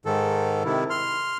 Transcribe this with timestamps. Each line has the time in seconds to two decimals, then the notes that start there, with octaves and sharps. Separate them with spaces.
0.06 G#2 D#3 A4
0.65 C3 D#3 E4
0.90 C6 F6